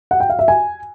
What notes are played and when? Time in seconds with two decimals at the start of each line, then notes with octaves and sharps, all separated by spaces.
0.11 F#5
0.20 G5
0.30 F5
0.39 E5
0.48 G#5